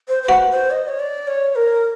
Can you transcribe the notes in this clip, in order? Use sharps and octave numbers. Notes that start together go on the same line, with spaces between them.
C5
C5
F#4 B4
C5
D#5
C#5
D5
C#5
A#4